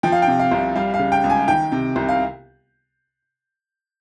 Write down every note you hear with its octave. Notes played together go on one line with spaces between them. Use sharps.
F3 G5
F5
G5
C3
F5
C2
G3 F5
F5
C#3
G5
C#2
G#5
D#3 G5
C3
C2
F5